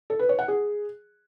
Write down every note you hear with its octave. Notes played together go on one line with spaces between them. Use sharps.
A4
B4
C#5
F#5
G#4